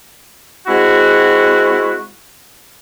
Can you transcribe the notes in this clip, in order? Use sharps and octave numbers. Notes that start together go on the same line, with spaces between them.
G#3 C4 E4 F#4